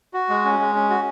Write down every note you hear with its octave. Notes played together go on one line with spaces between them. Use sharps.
F#4
G#3
C#4
G#3
C#4
F#4